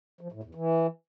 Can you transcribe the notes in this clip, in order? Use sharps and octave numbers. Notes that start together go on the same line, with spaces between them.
F3
A2
E2
E3